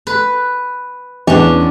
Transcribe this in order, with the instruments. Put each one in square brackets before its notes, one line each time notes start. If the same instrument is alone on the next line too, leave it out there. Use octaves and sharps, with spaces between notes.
[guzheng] B4
[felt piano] E2 [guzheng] C#4 D4